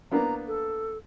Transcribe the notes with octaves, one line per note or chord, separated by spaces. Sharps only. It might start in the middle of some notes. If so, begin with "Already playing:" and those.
A#3 B3 D4 A#5
A4